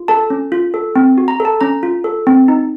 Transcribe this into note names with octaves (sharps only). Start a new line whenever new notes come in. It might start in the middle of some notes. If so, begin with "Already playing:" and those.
Already playing: F4
A4 A5
C#4
F4
A4
C4
F#4
A#5
A4
A5
C#4 A#5
F4
A4
C4
D#4